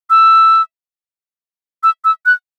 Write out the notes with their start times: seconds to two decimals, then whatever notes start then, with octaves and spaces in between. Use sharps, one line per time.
0.10 E6
1.83 E6
2.05 E6
2.26 F#6